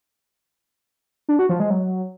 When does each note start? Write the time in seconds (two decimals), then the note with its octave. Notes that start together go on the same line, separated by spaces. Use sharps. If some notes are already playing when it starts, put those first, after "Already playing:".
1.29 D4
1.39 F#4
1.49 F3
1.60 G#3
1.70 F#3